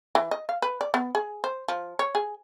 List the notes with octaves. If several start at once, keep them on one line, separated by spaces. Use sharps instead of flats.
E3
D#5
F5
B4
D5
B3
G#4
C5
F3
C#5
G#4